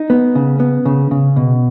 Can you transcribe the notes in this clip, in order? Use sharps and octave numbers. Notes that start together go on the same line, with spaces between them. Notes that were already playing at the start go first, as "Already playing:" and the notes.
Already playing: D#4
B3
C#3
B3
C#3
C#3
B2